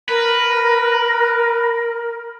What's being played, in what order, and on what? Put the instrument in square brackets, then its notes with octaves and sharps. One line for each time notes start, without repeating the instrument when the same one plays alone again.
[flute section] A#4 [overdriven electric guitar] B4